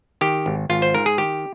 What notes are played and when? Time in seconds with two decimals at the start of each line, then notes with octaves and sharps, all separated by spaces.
0.21 D#3 G4
0.46 G#1
0.69 G#1 F4
0.82 C5
0.95 G#2 A#4
1.06 G#4
1.18 D#3 G4